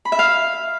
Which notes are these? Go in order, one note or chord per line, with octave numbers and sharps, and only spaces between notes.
B5
E5
F5